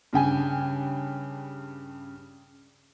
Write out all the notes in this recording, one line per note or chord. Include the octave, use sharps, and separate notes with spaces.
G2 C#3 G5 G#5